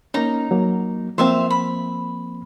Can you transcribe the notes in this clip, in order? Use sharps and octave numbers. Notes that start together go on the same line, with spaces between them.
A#3 C#4 D#4 A#5
F#3 A#3
F3 A#3 C4 C5 E5 F5
B5